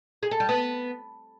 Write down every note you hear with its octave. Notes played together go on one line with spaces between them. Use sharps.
G#4
A4
G3
B3